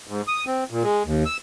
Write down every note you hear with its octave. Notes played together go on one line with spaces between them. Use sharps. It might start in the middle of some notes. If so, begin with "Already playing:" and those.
G#2
D#6
C4
A#2
G#3
D#2
E6